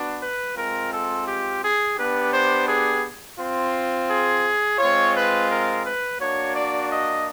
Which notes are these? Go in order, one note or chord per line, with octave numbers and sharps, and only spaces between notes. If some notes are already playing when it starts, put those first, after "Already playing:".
Already playing: B3 D4 F#4
B4
G#3 C4 F4 A#4
A4
G4
G#4
B3 D4 G4 B4
C5
G#4
C4 F4
G#4
G#3 C4 F4 C#5
B4
A#4
B4
A#3 D4 F#4 C#5
D5
D#5